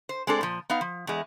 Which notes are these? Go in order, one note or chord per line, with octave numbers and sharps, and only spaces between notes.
C5
G#3 C4 D4 A4
A#2 F3
B3 D#4 F5
F3
E2 G#3